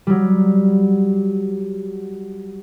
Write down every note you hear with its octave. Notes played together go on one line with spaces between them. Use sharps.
F#3 G3